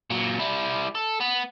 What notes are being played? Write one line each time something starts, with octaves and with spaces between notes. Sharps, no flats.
A#2 F#3
G3 E4
A4
B3